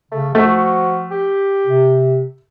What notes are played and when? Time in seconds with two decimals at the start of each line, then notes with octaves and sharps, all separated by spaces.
0.12 C#3 A3
0.35 F3 A3 F#4
1.11 G4
1.67 C3